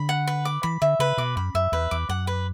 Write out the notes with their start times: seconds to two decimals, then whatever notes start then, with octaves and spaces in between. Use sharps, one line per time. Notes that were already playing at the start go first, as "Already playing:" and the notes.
Already playing: D3 B5
0.09 F#5
0.27 B4
0.45 D6
0.63 E3 B5
0.82 D3 E5
0.99 C#3 B4
1.18 B2 D6
1.36 F#2 B5
1.54 F#2 E5
1.72 E2 B4
1.91 E2 D6
2.09 F#2 F#5
2.27 B4